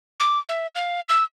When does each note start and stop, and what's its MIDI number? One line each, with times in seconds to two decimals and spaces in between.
0.20 0.39 86
0.49 0.67 76
0.75 1.00 77
1.09 1.23 88